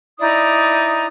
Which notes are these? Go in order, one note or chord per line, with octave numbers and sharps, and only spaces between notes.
D#4 E4 D5 D#6